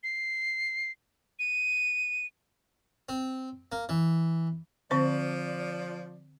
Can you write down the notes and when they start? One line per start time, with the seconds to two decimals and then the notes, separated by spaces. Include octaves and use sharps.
0.03 C7
1.39 D#7
3.09 C4
3.72 A#3
3.89 E3
4.91 D3 F3 C4 C5 D5